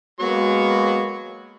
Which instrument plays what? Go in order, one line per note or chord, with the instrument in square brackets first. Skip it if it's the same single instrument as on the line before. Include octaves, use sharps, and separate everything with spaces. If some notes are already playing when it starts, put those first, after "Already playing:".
[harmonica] F#3 C#6 [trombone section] G#3 A#3 B3